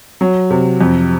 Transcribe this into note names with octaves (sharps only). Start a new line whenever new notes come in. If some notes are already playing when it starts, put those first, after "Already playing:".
F#3
C3
F2